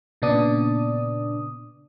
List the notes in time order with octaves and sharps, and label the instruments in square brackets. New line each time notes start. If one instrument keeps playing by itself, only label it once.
[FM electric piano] A#2 C#3 B3 D4 D5 D#6